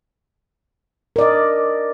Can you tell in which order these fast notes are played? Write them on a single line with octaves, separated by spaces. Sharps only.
A#4 D5 D#5